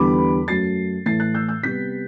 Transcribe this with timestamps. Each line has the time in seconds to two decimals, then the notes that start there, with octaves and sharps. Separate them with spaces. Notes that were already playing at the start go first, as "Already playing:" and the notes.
Already playing: E2 D3 G3 B3 B5 D6
0.48 F#2 F#3 A3 A6 C7
1.06 A2 E3 A3 A6 C7
1.20 F#6 A6
1.35 E6 G6
1.49 E6 G6
1.63 C3 G3 B3 G6 B6